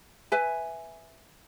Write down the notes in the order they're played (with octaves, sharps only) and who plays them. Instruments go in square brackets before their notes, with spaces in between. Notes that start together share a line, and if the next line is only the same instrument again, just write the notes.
[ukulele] B4 E5 G#5